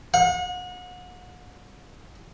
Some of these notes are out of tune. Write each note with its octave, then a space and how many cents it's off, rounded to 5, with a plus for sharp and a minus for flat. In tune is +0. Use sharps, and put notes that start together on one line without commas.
F#5 -35